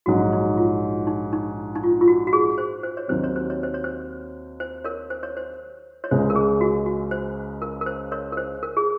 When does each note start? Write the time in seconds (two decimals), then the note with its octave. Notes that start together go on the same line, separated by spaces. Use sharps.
0.06 A#1 G#2 F#3 F#4
0.32 D#4
0.57 F4
1.07 D#4
1.33 D#4
1.75 D#4
1.83 F4
2.01 F4
2.08 F#4
2.27 F#4
2.33 G#4
2.58 C5
2.83 C5
2.97 C#5
3.08 D#2 D#3 F#3 C4 C5
3.24 C#5
3.36 C5
3.50 C#5
3.63 C5
3.74 C#5
3.84 C5
4.60 C5
4.84 A#4 C#5
5.10 C5
5.23 C#5
5.37 C5
6.04 C#5
6.11 C#2 C#3 G#3 C5
6.30 A#4
6.35 G#4
6.61 F#4
6.86 F#4
7.11 C5
7.62 A#4
7.81 A#4
7.86 C5
8.12 A#4 C#5
8.32 A#4
8.37 C5
8.63 A#4
8.77 G#4